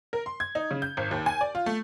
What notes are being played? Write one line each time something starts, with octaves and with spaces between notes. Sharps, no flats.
A#4
C6
G#6
D#4
C#3
G6
G#1
D#2
G#5
D5
F4
A3